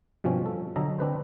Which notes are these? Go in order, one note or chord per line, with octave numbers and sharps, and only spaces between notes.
G2 B2 F3 C4 C#4
A4
D3 F#3 A4 D#5 A#5
C4 D4 B4 C5